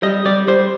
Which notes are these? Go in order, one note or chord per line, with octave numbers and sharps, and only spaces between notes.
G3 D#5
G3 D5
G3 C5